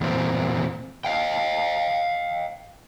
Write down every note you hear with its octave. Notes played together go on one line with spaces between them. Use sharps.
E2 A#2 C4
D#5 F5 G5